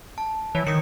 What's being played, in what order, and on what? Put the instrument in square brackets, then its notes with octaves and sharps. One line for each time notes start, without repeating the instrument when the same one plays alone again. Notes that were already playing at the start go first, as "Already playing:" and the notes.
[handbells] A5
[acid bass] E3 [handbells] C#5
[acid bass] D#3 [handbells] D#6 C#7